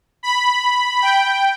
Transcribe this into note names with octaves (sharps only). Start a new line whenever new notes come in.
B5
G5